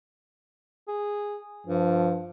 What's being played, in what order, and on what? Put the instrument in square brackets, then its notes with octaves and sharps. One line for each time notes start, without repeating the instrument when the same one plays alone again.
[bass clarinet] G#4
[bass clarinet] G2 [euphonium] F3